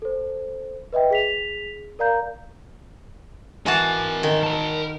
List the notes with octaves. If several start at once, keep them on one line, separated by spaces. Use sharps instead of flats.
A4 C5
B4 D#5 E5 G5
G#4 B6 F7
A#4 D5 F5 A#5 G6
E3 F#4 A#4 G#5 A5
D#3
A#4 A5